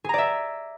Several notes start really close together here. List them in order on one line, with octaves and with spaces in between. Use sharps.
G#4 A#5 D5 E5